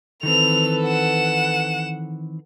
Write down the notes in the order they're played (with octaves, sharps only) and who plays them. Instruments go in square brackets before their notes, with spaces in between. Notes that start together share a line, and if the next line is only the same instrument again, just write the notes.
[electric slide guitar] D#3 E3 C4 [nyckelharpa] A4 B4 [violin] F7
[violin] F#5 E7